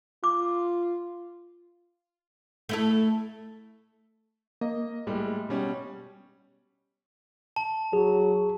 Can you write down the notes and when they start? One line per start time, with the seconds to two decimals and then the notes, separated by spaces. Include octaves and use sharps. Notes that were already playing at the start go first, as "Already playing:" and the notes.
0.24 F4 D6
2.69 A3 E4 A4
4.61 A#3 D#5
5.07 A2 G3 G#3
5.49 B2 G3 C#4
7.56 A5
7.93 F#3 G#4